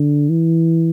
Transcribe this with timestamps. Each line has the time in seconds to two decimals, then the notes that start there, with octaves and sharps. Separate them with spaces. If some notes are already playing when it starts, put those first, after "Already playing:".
Already playing: D3
0.29 E3